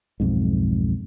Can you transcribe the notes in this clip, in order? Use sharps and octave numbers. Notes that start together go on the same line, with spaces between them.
B1 F2 G#2